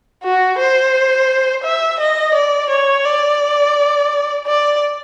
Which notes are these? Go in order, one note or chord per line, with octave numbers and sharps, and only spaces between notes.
F#4
C5
E5
D#5
D5
C#5
D5
D5